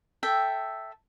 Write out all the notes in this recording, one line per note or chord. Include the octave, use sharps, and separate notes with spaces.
A4 E5 G5